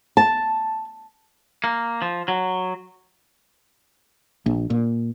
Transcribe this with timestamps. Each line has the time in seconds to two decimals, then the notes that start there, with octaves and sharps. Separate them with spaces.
0.17 A5
1.64 A#3
2.02 F3
2.28 F#3
4.46 A#1
4.70 A#2